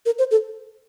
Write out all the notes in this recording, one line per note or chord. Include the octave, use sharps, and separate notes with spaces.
A#4
C5
A4